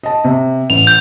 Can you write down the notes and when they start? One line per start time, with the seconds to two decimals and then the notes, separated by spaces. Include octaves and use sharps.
0.03 D#5 A5
0.24 C3
0.70 A1 F7
0.87 G6